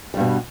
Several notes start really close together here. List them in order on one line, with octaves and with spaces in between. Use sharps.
G3 G2 B2